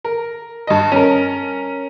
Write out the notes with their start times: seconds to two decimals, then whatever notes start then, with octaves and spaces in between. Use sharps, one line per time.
0.04 A#4
0.67 G2 D#5
0.92 C#4 A#4